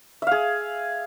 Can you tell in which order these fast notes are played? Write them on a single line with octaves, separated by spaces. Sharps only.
E5 F5 G#4